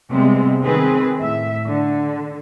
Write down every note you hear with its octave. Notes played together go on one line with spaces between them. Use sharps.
C3 G3 G#3 B3 C4
D#3 C4 G#4 B4
A2 E5
D3